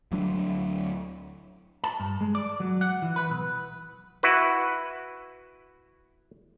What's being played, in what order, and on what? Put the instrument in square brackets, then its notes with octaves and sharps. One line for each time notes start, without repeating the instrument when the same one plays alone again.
[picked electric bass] D2 F#3 D4
[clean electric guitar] A5
G2
G#3
D5
F#3
F#5
E3
B4
B1
[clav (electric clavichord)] E4 F#4 B4